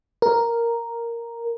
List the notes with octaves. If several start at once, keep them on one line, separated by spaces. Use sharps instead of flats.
A#4